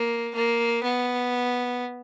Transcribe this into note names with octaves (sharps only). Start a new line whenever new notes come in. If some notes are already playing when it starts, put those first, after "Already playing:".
Already playing: A#3
A#3
B3